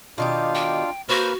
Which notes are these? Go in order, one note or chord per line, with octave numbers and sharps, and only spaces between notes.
B2 D#3 D4 F4 G4 F5
G5
A#3 F#4 B4 C5 F6